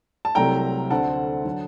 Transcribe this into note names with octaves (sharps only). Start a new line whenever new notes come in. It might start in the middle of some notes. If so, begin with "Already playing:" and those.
A5
C2 C3 F#3 A3 G5 A#5
D2 D3 A3 C4 F#5 A5
D3 F#3